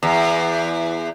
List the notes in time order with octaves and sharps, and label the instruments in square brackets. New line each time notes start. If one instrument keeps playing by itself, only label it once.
[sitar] E2